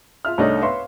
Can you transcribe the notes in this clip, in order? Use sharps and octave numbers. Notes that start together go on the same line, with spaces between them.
F4 E5 F6
C2 A3 D4 D#4 C#5
B4 C#5 E5 F5 C6 C#6